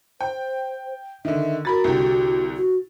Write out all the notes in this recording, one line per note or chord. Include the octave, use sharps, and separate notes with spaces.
C5 G5
D3 D#3 E5
F#4 A#4 B5 A6
C2 D3 G4
F#4